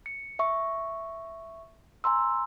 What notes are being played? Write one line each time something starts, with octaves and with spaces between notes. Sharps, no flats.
C#7
E5 C#6
G#5 A#5 C6 E6